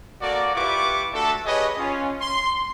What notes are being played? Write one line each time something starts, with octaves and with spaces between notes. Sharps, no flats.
A#3 F#4 A4 D5
E4 F4 G4 B4 C#6 D6
A3 D4 F#4 A4
G4 G#4 B4 C#5 D#5
C#4 F4
C6